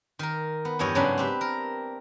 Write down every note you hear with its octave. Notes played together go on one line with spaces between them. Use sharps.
D#3 A#4
B3
E2 G2 E4 C#5 D#5 G5
G#2 C#3 F#3 C#4 D4 B5
C4 G4 B4
A#4